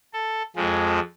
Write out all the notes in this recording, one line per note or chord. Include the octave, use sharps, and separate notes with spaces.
A4
F2 F3 G#3